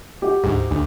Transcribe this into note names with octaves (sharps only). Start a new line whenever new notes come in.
F#4 G4
D2 G#2
D2